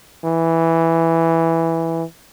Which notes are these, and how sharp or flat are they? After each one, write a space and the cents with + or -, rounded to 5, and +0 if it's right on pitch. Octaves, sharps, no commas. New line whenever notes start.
E3 +0